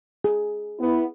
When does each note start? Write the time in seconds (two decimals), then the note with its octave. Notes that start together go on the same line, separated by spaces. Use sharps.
0.24 G#4
0.79 B3 E4